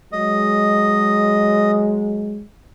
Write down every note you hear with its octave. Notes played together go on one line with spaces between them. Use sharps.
F#3 G#3 D#5